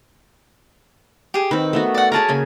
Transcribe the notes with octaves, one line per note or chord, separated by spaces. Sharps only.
G4 G#4
D#3 C4 B4
A3 B3 F#4
D5 F#5
G#4 A#4 B4 C#5 A5 A#5
C#3 A#3 G#5